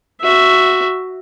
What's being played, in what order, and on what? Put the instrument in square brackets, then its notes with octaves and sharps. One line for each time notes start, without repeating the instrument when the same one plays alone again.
[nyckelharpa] F#4 E5